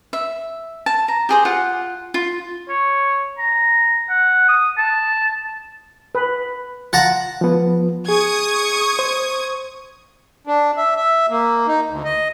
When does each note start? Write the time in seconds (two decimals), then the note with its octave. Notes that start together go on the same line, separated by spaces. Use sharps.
0.13 E5
0.86 A5
1.08 A#5
1.29 G4 G#4 C5
1.45 F4 F#5
2.14 F4
2.69 C#5
3.38 A#5
4.10 F#5
4.48 D#6
4.78 A5
6.15 B4
6.93 F4 F#5 A5 A#5
7.41 F3 B3
8.09 G#4 C#6 D#6 G#6
8.99 C5
10.47 D4
10.77 E5
10.96 E5
11.30 A#3
11.67 D#4
11.90 D2
12.05 D#5